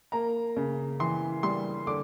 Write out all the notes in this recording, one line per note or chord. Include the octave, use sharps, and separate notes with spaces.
A#3 A#5
C#3
E3 C6
G3 C6
D3 D6